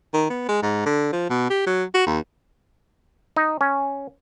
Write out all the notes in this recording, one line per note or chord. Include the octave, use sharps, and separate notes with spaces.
D#3
B3
G#3
G#2
D3
F3
B2
G4
F#3
F#4
D#2
D#4
C#4